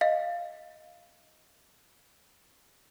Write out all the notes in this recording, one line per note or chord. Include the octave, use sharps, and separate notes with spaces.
D#5 F5